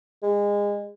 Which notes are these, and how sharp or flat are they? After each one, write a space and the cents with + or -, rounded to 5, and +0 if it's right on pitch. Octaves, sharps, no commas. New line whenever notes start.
G#3 -25